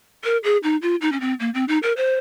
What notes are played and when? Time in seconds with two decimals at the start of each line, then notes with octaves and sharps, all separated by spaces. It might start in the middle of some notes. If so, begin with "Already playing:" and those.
0.24 A#4
0.44 G#4
0.63 D#4
0.82 F4
1.01 D#4
1.12 C#4
1.21 C4
1.40 A#3
1.54 C4
1.68 D#4
1.83 A#4
1.97 C5